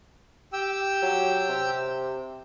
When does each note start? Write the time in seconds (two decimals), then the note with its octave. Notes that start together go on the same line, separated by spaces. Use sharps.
0.53 G4 G5 E6
1.03 F#3
1.49 C3